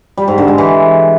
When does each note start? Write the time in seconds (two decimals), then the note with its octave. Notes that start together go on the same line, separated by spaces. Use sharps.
0.17 G3
0.28 G#2
0.38 D3
0.48 G#3
0.58 E3